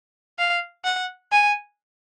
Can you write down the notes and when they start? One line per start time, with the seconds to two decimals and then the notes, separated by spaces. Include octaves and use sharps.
0.39 F5
0.85 F#5
1.32 G#5